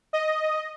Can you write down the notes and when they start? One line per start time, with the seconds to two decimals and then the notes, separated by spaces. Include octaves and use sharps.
0.13 D#5